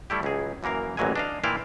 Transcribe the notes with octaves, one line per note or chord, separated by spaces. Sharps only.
G3 A3 E4 G4
C#2 F#3 G#4
F#2 E3 A#3 A#4 F5
A1 A#2 E3 F#3 G#3 G#5
D4 D#5 F5
A#2 E3 E4 F4 F5 G5